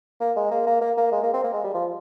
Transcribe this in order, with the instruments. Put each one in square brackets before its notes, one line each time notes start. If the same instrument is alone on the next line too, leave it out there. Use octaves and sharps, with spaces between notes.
[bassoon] A#3
G#3
A#3
A#3
A#3
A#3
G#3
A#3
C4
A#3
G#3
G3
F3